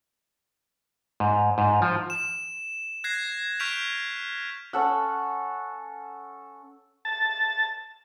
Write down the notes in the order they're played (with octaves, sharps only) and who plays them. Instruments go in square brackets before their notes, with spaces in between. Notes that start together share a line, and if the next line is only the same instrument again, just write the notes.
[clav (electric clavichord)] G#2
G#2
F3
[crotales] E7
F#6 G#6 A#6 C7
C#6 F6 G6 B6 D7 F7
[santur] C#4 A4 F#5
[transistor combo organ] A5